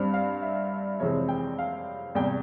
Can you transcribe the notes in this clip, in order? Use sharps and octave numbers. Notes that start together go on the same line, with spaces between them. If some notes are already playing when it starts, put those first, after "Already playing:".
Already playing: G2 G3 C4
F5
E5
F2 C3 E3 G#3 C4 C#5
G5
F5
E2 C3 G3 G5